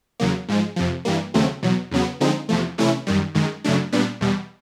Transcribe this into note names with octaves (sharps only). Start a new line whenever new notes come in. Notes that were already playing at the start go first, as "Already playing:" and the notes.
E2 C#3 F#3 A#3
G#2 F3 G#3
F2 C3 F3
G2 E3 G3 A#3
D#2 C#3 F#3 A3 C4
E2 B2 F#3
E2 C#3 F#3 B3
D3 F3 G#3 C4 D#4
E2 C3 F3 A3
C3 E3 A3 C#4 E4
F#2 D#3 G3
F#2 D#3 G#3
F#2 C#3 F#3 A3 D4
A#2 G3 B3 D4
E2 B2 G3